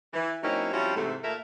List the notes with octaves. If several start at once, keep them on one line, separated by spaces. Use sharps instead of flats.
E3
F#3 A#3 C4 C#4 D#4 E4
F3 G3 C4 C#4 E4 F#4
G#2 C3 E3 A3
A#2 A3 A#3 A#4 E5